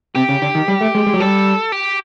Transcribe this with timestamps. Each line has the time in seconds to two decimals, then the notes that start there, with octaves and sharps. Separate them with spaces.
0.15 C3 G4
0.29 C#3
0.42 D3
0.55 D#3
0.68 G3
0.81 A3
0.95 G#3
1.07 G#3
1.14 F#3
1.20 G3 A4
1.72 G4